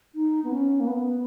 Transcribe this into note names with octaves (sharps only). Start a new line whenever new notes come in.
D#4
B3
C#4
A#3
B3